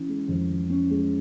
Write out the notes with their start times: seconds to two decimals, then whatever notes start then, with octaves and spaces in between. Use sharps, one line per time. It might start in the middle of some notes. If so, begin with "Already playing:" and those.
Already playing: E3 C#4
0.09 G#3
0.28 F2
0.49 E3
0.70 C#4
0.90 G#3